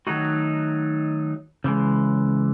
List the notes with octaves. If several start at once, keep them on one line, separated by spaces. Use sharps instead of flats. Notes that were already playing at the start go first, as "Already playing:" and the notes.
D#3 F#3 A3 D#4 F#4
C#3 E3 G#3